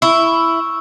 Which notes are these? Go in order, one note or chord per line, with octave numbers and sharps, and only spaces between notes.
E4 C#6 E6